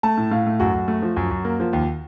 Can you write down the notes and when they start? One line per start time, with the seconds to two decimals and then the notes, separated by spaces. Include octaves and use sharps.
0.03 A3 A5
0.17 A2
0.31 A2 F5
0.46 A3
0.60 F#2 F#4
0.74 F#2
0.88 A3
1.02 F3
1.16 F#2
1.31 F#2
1.45 A#3
1.60 F3
1.73 D#2